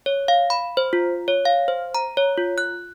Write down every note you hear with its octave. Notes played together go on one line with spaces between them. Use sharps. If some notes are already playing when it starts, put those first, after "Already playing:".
C#5
F5
B5
C5
F4
C#5
F5
C5
A#5
C#5
F4
F#6